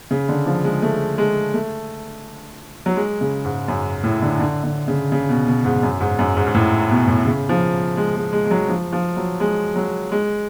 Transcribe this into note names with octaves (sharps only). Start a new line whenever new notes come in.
C#3
D3
F3
G#3
A3
G#3
A3
F#3
G#3
C#3
G#2
F#2
A2
D3
D3
D3
C#3
C#3
B2
B2
G#2
F#2
G#2
F#2
G#2
G#2
A2
B2
A2
C#3
F3
G#3
G#3
G#3
G#3
F#3
F3
F3
F#3
G#3
F#3
G#3